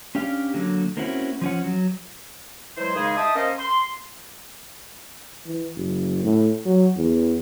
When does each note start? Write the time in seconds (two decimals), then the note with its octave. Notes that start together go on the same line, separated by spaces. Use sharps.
0.15 C#4 D4 G4 F5
0.54 D3 F#3 A#3
0.97 A#3 C4 C#4 E4 F#4
1.41 F3 C#4 F#5
1.64 F#3
2.78 E3 F#3 G#3 C5
2.95 D#2 C#3 G#3 D#4 G#4
3.17 D#5 E5 G5 A5 D#6
3.35 A#3 C#4 C5 D#5
3.59 C6
5.46 E3
5.76 F#1
6.24 A2
6.65 F#3
6.97 E2